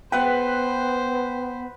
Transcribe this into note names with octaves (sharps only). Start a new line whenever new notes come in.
B3 B4 C5 F#5 G5